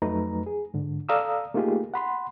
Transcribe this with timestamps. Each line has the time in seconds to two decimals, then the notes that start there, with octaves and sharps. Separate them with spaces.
0.02 F2 F#3 A3 D#4 B4 A#5
0.46 G#4
0.74 G#2 D3
1.09 A4 D5 F5 A#5 D#6 E6
1.54 A3 A#3 D#4 F4 G4 G#4
1.94 F#5 B5 C6